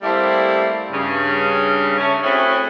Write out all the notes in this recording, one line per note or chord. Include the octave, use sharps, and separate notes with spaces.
G3 A3 A#3 C4 E4
G2 C#3
A3 C#4
A3 C4 C#4 E4 F#4 G#4